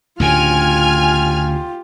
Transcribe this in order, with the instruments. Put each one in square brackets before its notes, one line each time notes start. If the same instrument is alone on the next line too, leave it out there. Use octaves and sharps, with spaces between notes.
[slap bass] D2 A2 C#3 [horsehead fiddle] F4 G4 [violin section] G#5 F6